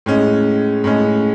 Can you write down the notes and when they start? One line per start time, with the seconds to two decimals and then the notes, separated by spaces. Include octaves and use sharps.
0.06 A2 G#3 C#4
0.84 A2 G#3 C#4